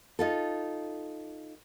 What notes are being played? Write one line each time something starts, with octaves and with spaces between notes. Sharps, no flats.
D#4 F4 A4